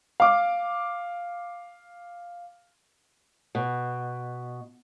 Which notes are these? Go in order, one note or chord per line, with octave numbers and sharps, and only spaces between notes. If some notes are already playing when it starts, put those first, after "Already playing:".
F5 D6
B2